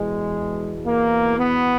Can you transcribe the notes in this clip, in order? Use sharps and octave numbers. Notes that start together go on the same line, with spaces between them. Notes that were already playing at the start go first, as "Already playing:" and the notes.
Already playing: E2 B2 G#3
A#3
B3